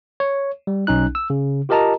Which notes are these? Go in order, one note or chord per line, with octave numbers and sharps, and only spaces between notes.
C#5
G3
B1 C#4 D#4 F#6
E6
C#3
F4 G4 A#4 D#5 A5 A#5